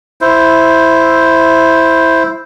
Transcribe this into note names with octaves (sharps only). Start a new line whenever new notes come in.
E4 C5